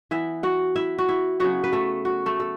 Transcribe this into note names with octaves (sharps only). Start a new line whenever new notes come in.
E3 B3 E4 E5
F#4 F#5
E4 E5
F#4
E4
C#3 F#3 B3 F#4
B4
A3 A4
F#4
A3 A4
A4